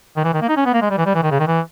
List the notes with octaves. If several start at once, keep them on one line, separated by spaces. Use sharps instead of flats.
D#3
E3
D#3
A#3
D#4
C#4
B3
A#3
G#3
G3
E3
G3
E3
D#3
C#3
D#3
E3